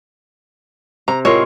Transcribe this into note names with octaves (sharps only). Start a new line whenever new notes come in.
C3 A#5
A2 G#3 C4 F4 A#4 C#5